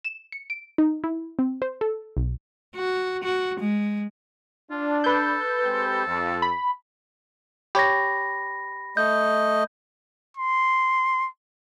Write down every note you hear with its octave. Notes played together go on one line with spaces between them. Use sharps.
E7
C#7
D7
D#4
E4
C4
C5
A4
B1
F#4
F#4
G#3
D4 F4
A4 B4 G6
G#3 C4 G4
F2
B5
G4 C#5 B5 A#6
A3 D#5 G6
C6